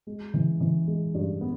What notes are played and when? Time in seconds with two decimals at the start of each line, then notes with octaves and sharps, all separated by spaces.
0.07 G#3
0.34 E3
0.60 E3
0.87 G#3
1.14 G2
1.41 B3